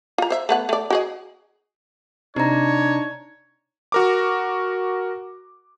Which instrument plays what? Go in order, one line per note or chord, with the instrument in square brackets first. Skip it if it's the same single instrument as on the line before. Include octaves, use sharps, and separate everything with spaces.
[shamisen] F4 A#5
C5 E5
A3 B3 F#5
A3 D5
F#4 G#4 D#5
[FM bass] C3 [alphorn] D4 [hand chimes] D#4 A#5 [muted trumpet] C#5
[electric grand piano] F#4 A#4 D6